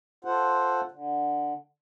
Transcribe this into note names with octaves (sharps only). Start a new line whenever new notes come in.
F4 A4 C5 F#5
D3